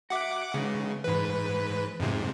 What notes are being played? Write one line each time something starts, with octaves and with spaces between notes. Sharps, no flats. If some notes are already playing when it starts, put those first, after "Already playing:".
F#4 E5 F#5 D6
C#3 G#3 B3 D#4
G#2 E3 B4
F2 G#2 C3